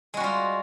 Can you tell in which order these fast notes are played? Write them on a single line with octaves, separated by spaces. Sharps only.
G#3 F#4 G3 F4